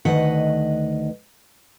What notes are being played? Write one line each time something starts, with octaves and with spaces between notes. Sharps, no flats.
D2 D#3 B4 D#5 F#5